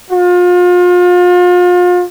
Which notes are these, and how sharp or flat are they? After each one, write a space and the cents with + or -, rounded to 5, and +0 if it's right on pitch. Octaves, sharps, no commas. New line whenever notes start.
F4 +35